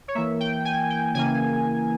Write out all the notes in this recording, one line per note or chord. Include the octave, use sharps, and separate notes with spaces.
C#5
E3 A#3 E5
G5
G#5
G5
C#3 E3 A#3 G#5